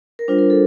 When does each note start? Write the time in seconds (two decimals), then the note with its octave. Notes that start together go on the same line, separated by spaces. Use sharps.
0.19 A#4
0.28 G3 D4 F4 C5
0.38 A#4
0.50 A4